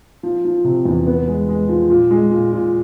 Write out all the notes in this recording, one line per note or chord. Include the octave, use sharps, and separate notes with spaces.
F3
F3
C3
E2
B3
G#3
G#3
F3
A#2
G#3
A#2
A#2